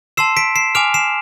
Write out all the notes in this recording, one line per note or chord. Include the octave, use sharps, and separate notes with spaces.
A5 C6 E6 C7 E7
B6 D7
C7 E7
G#5 D6 F6 D7 F7
C7 E7